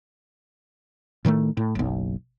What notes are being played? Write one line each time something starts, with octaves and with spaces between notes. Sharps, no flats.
A2 D#3 E3 A3
A2
F#1 B1